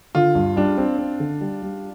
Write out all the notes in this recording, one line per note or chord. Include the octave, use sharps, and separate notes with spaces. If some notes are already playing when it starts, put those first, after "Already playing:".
D3 F4
G2
G3 D4
C4
C4
D3
G3
G3